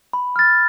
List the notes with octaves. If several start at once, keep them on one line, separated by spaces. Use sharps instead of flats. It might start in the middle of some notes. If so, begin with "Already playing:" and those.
B5
F6 A6